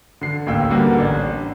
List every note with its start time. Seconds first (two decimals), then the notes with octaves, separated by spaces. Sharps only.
0.21 D3 C7
0.46 A1 D#2 A2 G5 E6
0.70 D3 G3 A#3 B3 F#4
0.98 A1 D4